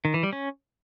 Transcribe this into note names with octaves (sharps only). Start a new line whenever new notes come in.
D#3
E3
G3
C#4